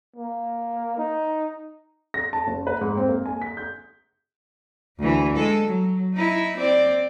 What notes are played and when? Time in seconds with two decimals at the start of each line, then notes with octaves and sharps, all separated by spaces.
0.16 A#3
0.98 D#4
2.14 A#6
2.33 A5
2.47 F#1
2.67 B4
2.81 G#2
2.97 C4
3.09 A#3
3.26 G#5
3.42 B6
3.57 G6
4.98 D2 E3
5.36 G#3 A4
5.65 F#3
6.14 D#4 E4
6.57 C4 D5